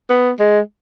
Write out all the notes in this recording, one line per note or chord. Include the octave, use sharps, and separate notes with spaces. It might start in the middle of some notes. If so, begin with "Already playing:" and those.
B3
G#3